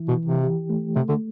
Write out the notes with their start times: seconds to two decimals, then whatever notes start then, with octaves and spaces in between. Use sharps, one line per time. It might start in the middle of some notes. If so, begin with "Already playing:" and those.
Already playing: E3 E4
0.08 B2
0.17 E3
0.26 C3
0.43 G4
0.70 A3
0.95 C3 A3
1.08 D3